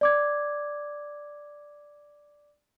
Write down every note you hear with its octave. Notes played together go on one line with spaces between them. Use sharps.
D5 D6 G#6